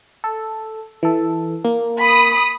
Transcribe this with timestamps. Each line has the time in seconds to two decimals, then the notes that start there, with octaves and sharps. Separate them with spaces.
0.24 A4
1.03 E3 A4
1.65 A#3
2.00 B5 D#6